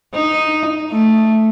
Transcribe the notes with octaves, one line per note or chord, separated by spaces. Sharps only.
D#4
A3